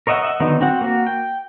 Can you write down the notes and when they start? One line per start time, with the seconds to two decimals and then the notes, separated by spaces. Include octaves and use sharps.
0.07 A#4 C#5 D#5 E5 F#5
0.22 D#5 E5 F#5
0.40 D3 D#3 F#3 B3 D#4
0.61 C4 F#4 F#5
0.81 A#3 F#4
1.07 G5